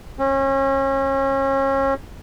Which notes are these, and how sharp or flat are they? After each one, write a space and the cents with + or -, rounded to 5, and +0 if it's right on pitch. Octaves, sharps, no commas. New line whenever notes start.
C#4 -35